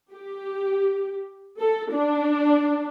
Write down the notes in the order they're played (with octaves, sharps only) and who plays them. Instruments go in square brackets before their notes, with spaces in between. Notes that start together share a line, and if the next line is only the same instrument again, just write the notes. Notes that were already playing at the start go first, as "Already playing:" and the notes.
[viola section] G4
A4
D4